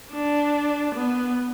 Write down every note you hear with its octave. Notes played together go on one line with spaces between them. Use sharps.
D4
B3